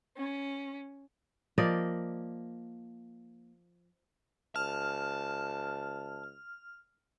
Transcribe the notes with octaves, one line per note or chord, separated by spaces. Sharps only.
C#4
F3 A#3 D5 D#5
C#2 A5 F6